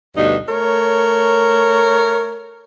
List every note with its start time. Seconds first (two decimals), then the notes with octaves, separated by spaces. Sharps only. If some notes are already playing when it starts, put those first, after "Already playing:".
0.17 D2 G2 B2 D#4
0.48 A3 A#4 C#5